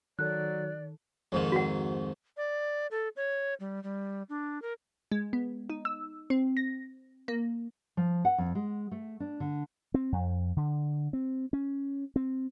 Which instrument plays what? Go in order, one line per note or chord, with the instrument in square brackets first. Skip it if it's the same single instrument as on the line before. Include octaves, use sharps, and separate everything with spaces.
[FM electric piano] D#3 A4 [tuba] F#3 [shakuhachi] D5 [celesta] F#6
[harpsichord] F2 G#2 D#3
[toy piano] F#4 F#5
[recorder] D5
A4
C#5
G3
G3
D4
A#4
[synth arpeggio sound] G#3
B3
D#4
E6
C4
A#6
A#3
[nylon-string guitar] F3
F#5
F2
G#3
A3
D4
D3
[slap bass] C4
F2
D3
C4
C#4
C4